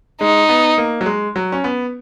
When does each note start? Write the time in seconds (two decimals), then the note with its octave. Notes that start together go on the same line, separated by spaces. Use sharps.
0.21 G#3 D#4
0.49 B3
0.78 A#3
1.01 F#3
1.06 G#3
1.36 F#3
1.52 C#4
1.64 B3